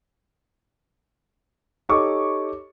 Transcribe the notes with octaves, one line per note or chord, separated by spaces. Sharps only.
D#4 G4 A4 C#5 C#6 D6